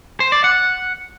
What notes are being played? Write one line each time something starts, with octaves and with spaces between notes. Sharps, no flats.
C5
D5
F#5